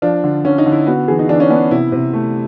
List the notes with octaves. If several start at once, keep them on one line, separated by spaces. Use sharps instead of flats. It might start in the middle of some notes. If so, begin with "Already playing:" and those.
F3 D4
D3
D3 C#4
D#4
D3
E4
B3 F#4
E3 G#4
D#4
E3 D4
C#4
B3 D4
C3 E4
C3
A3